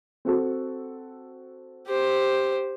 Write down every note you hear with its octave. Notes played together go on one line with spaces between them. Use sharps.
C4 F#4 A4
G4 C5